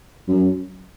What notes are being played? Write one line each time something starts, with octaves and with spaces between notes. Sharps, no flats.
F#2